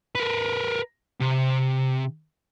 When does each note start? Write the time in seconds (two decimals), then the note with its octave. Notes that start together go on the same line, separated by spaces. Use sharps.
0.15 A#4 B4
1.20 C3